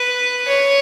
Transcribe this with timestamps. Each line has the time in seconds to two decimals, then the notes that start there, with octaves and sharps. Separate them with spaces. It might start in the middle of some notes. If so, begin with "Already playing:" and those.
Already playing: B4
0.47 C#5